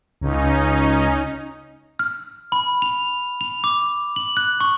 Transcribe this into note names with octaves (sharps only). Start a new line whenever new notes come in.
C#2 C#4 D#4
F6
B5
F7
F7
D6
F#7
F#6
C#6